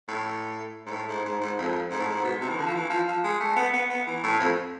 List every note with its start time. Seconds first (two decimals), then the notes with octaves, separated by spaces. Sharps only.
0.08 A2
0.86 G#2
0.91 A2
1.08 G#2
1.25 G#2
1.40 G#2
1.58 F2
1.91 G#2
1.99 A2
2.07 G#2
2.24 B2
2.41 C3
2.49 E3
2.57 D3
2.66 F3
2.74 E3
2.90 F3
3.07 F3
3.24 G#3
3.40 A3
3.56 B3
3.73 B3
3.90 B3
4.07 E3
4.23 A2
4.39 F2